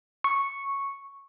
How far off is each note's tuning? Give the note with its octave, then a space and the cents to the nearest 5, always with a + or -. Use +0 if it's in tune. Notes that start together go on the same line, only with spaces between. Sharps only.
C#6 -5